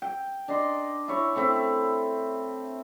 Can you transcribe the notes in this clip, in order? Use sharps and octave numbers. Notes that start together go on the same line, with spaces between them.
G5
D4 D5 D#5 C6
E4 C#5
A3 C4 E4